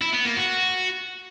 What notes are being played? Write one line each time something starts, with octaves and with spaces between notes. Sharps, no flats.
E4
B3
A#3
F#4